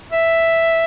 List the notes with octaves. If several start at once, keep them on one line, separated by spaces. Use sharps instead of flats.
E5